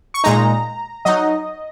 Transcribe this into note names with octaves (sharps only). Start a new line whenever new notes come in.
C#6
A#2 G#3 D#4 A#5
F#3 D#4 D#5